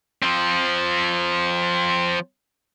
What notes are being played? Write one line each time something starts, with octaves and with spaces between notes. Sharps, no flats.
F3 C4